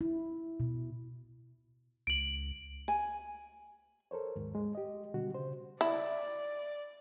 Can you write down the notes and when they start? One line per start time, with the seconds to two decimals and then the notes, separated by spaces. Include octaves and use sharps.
0.01 E4
0.60 B2
2.07 C#2 D7 F#7
2.88 G#5
4.11 A4 A#4 C5 C#5
4.36 D#2 G#2
4.55 G#3
4.75 G4 D#5
5.14 B2 D3 G3 F#4
5.35 C#3 C5
5.81 E4 D5